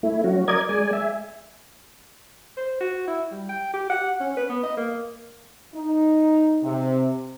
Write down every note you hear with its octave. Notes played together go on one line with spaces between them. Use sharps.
A3 E4
F#3 C#4 F#4
A#4 D5 D#5 G#6
G#3 D5 G#5
E5 G#5
C5
F#4
E4
G3
G5
G4
F#5
C#4
B4
B3
D#5
A#3
D#4
C3